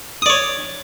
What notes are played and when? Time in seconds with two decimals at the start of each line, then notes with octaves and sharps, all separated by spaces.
0.22 D#6
0.26 D5
0.30 C#5